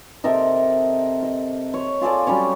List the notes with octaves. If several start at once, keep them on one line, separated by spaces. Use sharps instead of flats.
C3 A4 A#4 D#5
D#5
C#5
F4 G#4 A4 D5
F#3 G3 C#4 C#5